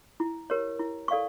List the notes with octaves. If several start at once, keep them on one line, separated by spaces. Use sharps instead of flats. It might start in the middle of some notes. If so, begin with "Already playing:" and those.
E4
G4 A#4 C#5
E4
A4 D5 F5 C#6